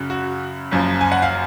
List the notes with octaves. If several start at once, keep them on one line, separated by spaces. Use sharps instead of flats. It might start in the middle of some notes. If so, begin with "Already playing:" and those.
Already playing: F#2 C#3 F#3
F#4
F#1 F#2 F3
G#5
F#5
F5